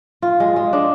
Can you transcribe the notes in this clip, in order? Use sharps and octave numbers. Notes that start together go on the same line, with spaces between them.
F4
G#3
G#3
D4